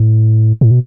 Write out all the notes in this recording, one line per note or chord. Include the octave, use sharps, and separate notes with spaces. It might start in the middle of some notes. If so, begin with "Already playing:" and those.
Already playing: A2
A2
B2